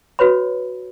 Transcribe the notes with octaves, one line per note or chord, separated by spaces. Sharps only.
F#4 B4 C#5 B5